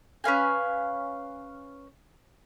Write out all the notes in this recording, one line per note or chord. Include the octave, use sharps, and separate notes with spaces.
C#4 B4 F5 G#5